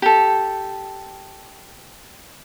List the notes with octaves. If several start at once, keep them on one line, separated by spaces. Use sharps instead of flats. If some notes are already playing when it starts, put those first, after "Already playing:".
G4 A4